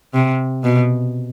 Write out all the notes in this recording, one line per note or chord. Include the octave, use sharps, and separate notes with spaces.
C3
B2